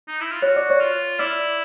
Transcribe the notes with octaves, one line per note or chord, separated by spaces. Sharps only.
D#4
E4
F4
F#4 C#5
D5
C#5
F4
E4 D5